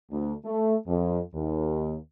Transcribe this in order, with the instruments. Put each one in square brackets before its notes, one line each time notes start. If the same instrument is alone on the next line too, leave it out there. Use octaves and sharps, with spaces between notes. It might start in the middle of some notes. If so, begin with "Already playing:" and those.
[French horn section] D2
A3
F2
D#2